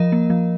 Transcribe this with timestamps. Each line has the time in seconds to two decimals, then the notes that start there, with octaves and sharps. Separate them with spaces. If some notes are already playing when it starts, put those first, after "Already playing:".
Already playing: F3 A#4 D#5
0.12 A#3
0.30 F3